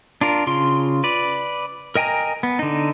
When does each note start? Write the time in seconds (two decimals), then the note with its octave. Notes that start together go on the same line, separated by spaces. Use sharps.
0.21 D4 F4 A#4
0.47 C#3 F4 C6
1.04 B4 D5
1.95 A#4 D#5 G5 G#5 A#5
2.43 B3
2.59 D3 D#4